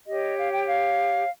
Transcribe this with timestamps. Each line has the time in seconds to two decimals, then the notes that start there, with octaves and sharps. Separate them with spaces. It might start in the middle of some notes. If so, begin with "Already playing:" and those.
0.07 G4 C#5 D#5
0.37 F5
0.52 G5
0.67 F5